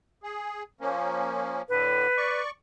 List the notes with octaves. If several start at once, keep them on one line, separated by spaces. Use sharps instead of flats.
G#4
F3 A#3 C#4
A2 D3 B4
D5 C#6